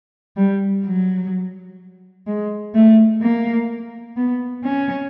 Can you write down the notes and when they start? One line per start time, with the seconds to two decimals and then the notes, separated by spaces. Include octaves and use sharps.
0.37 G3
0.85 F#3
2.27 G#3
2.74 A3
3.22 A#3
4.17 B3
4.64 C#4